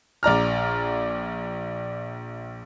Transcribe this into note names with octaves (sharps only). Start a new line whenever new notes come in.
A#1 D5 A#5 F6